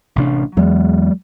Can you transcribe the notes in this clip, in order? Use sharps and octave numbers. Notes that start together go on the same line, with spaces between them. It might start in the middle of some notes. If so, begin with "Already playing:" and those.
A1 C3 D4
E2 F#3 G#3